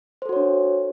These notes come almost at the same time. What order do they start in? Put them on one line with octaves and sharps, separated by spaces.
C5 A4 F#4 C#5 D4